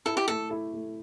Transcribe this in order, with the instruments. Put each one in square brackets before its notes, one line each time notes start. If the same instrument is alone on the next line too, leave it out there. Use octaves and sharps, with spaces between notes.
[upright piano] E4 [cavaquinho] A4
[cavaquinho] G4
[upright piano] A3 [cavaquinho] A4
[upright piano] E4
A3